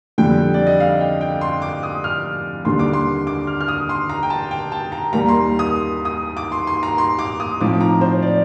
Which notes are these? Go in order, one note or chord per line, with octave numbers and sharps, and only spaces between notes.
F2 D3 G3 G5
D5
D#5
F5
G5
G5
C6
D6
D#6
F6
D#2 D3 G3 D4 C6
D6
C6
D6
F6
F6
D#6
C6
A#5
G5
A5
G5
A5
A#5
D#2 D#3 G3 A#3 A#5
C6
D#6
D#6
D6
C6
C6
A#5
C6
D6
D#6
A2 F3 C4 D#4 D6
A#5
C5
D5